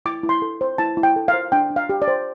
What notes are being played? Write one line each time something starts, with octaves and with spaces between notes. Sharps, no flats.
E4 D6
E4
C6
A4
C5
E4 A5
E4
G5
A4
F5
C5
D4 G5
D4
F5
G4
D5
C5